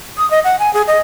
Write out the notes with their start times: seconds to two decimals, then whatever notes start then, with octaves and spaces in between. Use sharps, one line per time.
0.18 D#6
0.30 D#5
0.44 F#5
0.59 G#5
0.74 G#4
0.87 D#5